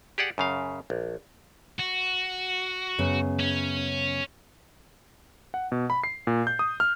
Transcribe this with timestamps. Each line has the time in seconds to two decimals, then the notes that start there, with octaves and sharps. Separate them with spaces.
0.18 G4 G#4 D5 F#5
0.38 F#2 C#3 F5
0.90 A#1
1.80 F#4
2.98 F#2 C#3 B3
3.40 C#4
5.54 F#5
5.72 B2
5.90 B5
6.04 C7
6.27 A#2
6.47 G6
6.59 D#6
6.80 F6